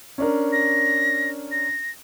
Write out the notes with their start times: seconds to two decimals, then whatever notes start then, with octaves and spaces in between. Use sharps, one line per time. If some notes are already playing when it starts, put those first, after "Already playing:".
0.18 C#4 D4 A#4
0.53 A#6
1.51 A#6